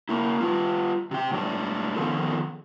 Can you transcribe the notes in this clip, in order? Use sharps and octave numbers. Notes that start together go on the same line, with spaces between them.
A#3 E4
G3 F4
C3 G5
A2 G3 D4
D#3 F3 B3 G#4 A4